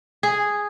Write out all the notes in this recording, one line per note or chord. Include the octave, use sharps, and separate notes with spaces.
G#4